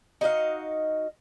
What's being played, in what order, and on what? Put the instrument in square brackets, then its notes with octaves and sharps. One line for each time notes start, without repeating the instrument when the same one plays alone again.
[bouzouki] D#4 F#4 D#5 F5